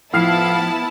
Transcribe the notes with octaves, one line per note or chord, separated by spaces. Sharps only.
A2 F3 B3 E4 F5 A5 F6 C7